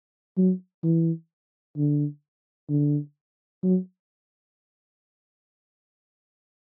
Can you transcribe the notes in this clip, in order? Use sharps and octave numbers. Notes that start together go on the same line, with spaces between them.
F#3
E3
D3
D3
F#3